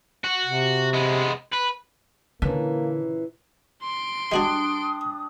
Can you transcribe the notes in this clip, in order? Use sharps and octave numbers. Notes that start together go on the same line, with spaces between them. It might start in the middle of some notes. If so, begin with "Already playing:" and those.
F#4
C3
G#3 B3
B4
A#2 D3 E3 A#3 C#4
C6 D7
G3 G#3 D4 F#4 G#4 D#6